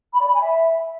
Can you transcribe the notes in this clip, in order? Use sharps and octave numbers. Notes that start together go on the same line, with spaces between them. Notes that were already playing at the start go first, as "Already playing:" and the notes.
B5
D5
B5
G#5
E5